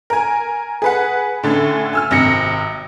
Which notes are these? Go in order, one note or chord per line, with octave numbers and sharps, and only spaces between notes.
A#4 G#5
G#4 B4 F#5
A2 D3 C#4 A4
G#5 E6 F6
G#1 C3 A#6 C#7